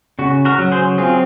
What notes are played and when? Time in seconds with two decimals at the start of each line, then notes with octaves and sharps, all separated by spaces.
0.19 C#3 F#4
0.45 F#4 A#4
0.59 F#3
0.71 G#4 C5
0.98 C4 F4 G#4